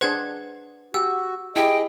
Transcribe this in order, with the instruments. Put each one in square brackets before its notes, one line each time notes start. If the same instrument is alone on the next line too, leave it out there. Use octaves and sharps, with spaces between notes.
[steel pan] D4 G#4 C5 [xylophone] B4 F#5 G#6
[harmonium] F#4 [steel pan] G4 [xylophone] F#5 E6
[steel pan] E4 G4 [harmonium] G#4 D#5 [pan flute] G5